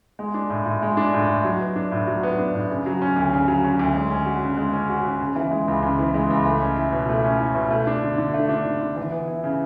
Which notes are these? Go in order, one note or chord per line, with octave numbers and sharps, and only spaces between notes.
G#3
D4
A2
A2
G#3
D4
A2
A2
F#3
B3
D4
A2
F#3
B3
D4
A2
C#3
F#3
C#4
D2
C#3
F#3
C#4
D2
G#3
C#4
F#4
C#3
G#3
C#4
F#4
C#3
C#3
E3
G#3
C#2
C#3
E3
G#3
C#2
A3
C#4
E4
B2
A3
C#4
E4
B2
A3
D4
D3
D3
A3
D4
D3
D3
E3
B3
E4
C#3